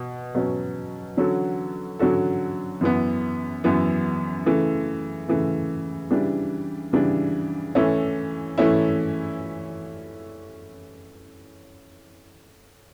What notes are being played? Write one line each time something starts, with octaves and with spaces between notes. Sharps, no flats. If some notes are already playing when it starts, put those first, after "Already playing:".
Already playing: B2
B2 F#3 C#4
D3 F#3 C#4 F#4 A4
D3 F#3 C#4 F#4 A4
F#2 E3 B3
F#2 E3 B3
C#3 E3 A3
C#3 E3 A3
C#3 E3 G3 D4
C#3 E3 G3 D4
E3 A3 C#4 E4
E3 A3 C#4 E4